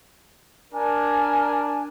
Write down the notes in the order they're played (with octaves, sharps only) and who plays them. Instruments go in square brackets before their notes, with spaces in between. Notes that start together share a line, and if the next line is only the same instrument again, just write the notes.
[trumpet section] D4 A#4 [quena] G#5